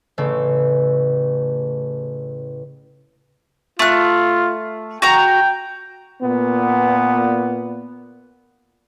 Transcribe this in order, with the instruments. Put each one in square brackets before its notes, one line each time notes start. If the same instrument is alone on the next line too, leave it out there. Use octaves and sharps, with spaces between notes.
[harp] A1 C#3 A4
[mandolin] A3 F#6 [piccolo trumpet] F4
[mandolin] F#4 A#5 [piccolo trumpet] G5
[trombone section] A#2 B3